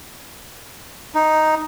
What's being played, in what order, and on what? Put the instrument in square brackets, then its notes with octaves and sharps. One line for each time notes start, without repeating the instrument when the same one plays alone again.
[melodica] D#4